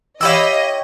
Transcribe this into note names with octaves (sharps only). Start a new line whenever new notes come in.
E4 G4 C#5 D#5 F5 B5 E6